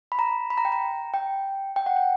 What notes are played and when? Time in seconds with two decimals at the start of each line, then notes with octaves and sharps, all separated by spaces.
0.12 B5
0.19 A#5
0.50 B5
0.58 A#5
0.65 G5
0.72 A#5
1.14 G5
1.76 G5
1.86 F#5
1.97 G5